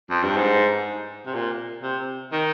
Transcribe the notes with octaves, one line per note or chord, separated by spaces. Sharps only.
F2
G2
G#2
C3
A#2
C3
D#3